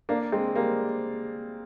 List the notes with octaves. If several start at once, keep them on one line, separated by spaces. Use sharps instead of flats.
A#3 D4
G#3 C4
G3 A#3